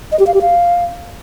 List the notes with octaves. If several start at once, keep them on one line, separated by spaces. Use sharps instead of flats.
D#5
G4
F5
G4
F5